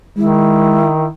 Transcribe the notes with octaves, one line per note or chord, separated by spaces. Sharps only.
D#3 G#3 E4